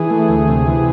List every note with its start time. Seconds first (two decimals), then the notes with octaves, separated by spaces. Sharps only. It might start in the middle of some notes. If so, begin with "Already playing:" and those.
Already playing: E3 G#4
0.10 A3
0.28 D2
0.48 C3
0.67 E3